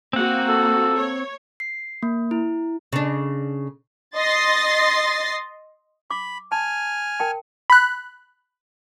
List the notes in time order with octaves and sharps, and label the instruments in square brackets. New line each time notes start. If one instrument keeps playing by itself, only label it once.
[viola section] A#3 F#4 [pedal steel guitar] C4 F#5
[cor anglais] A4
[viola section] C#5
[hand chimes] C7
A#3
E4
[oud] C#3 D4
[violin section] D#5 C6 A6 A#6 C7
[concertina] B5 [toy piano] D6
[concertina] G#5 F6 [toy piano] A5
[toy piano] A#4 G5 A5
[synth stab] B5 F#6